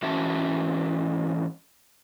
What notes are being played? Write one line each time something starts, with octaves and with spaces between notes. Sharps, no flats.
G#2 E3 C#4 F#4 E5 A5